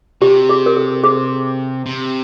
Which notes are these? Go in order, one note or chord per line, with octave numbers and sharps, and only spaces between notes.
C3 G4
G#4
A#4
A4
G#4
C3